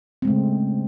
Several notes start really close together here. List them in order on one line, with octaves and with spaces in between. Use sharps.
C4 G#3 A3 C#3